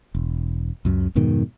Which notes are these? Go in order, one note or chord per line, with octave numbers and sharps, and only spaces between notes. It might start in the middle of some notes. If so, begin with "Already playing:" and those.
E1
C#2 F#2 C#3
F2 G#2 B2 D#3